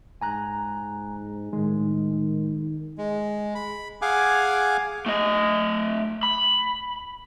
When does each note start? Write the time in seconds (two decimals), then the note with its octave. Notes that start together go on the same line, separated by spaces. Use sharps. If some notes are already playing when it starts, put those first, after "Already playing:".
0.21 G#2 G#5 A#5 F#6
1.53 A2 D#3 G#3
2.98 G#3
3.55 B5
4.02 G#4 F5 F#5 G#5 D6
5.06 A3 D#5
6.23 B5